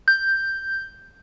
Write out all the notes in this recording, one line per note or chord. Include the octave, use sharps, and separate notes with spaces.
G6